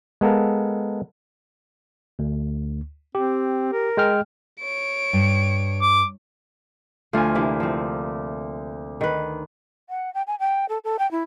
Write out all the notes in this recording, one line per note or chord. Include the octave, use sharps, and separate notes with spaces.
G#3 B3 A4 A#4 F5
D2
C4 G4
A#4
G#3 G5 F6
C#5 D7
G2
D6
D2 F3 A3 F4 G#5
C3 E3 A#3 D4
F3 C4
D#3 B4
F#5
G5
G#5
G5
A4
A4
G5
E4